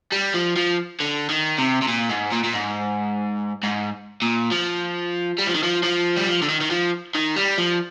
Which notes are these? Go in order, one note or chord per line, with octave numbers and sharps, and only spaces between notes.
G3
F3
F3
D3
D#3
C3
C3
A#2
G#2
A#2
A#2
G#2
G#2
A#2
F3
G3
F3
D#3
F3
F3
G3
F3
D3
D#3
D#3
F3
D#3
G3
F3